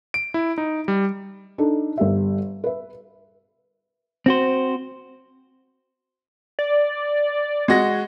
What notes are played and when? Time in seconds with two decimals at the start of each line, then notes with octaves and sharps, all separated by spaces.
0.14 D7
0.34 E4
0.58 D#4
0.88 G3
1.58 D4 D#4 A4
1.98 G1 G4 E5
2.64 B4 E5
4.26 C4 F#4 C5
6.59 D5
7.68 G#3 F#4 A#6